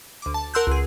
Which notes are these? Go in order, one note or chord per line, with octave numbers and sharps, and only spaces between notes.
D2 D6
A5
A#4 F#5 C6 E6 F#6 G6
C#2 G#4